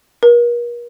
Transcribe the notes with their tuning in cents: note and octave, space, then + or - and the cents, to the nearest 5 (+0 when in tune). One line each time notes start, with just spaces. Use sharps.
A#4 +40